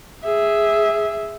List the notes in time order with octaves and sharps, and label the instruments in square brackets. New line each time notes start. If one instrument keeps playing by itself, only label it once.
[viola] G#4 E5